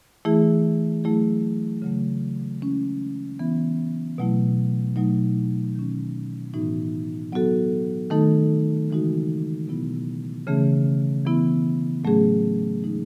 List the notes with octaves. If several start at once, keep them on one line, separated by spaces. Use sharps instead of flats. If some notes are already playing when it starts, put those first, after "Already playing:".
E3 A3 E4 G#4
F#3 A3 E4 G#4
C#3 F#3 A3
G#3 C#4 E4
E3 B3 E4
B2 F#3 A3 E4
B2 F#3 A3 D#4
D#3 F#3 C#4
A2 E3 B3 D#4 F#4
F#3 B3 F#4 A4
D#3 A3 D#4 A4
C#3 E3 G#3 D#4 F#4
B2 F#3 B3 E4
C#3 E3 A3 C#4 G#4
E3 B3 E4
A2 F#3 A3 C#4 G#4
E3 G#3 D#4 G#4